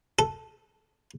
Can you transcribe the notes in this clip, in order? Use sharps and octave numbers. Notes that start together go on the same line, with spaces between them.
A4